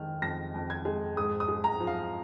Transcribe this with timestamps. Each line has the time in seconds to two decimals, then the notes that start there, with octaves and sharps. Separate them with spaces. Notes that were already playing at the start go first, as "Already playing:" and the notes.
Already playing: F2 D#3 G#3 F6
0.22 F2 A#6
0.54 F2
0.70 G#6
0.85 G#3
1.17 G#2 D#6
1.40 D#6
1.48 G#3
1.64 A#5
1.80 F3
1.87 F5